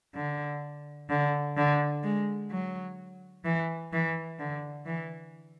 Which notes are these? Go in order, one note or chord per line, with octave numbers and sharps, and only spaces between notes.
D3
D3
D3
G#3
F#3
E3
E3
D3
E3